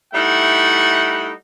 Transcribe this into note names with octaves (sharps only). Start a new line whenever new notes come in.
G3 A3 D#4 E4 E5 F#5